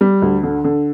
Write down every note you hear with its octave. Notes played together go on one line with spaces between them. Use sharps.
G3
D2
D3
D3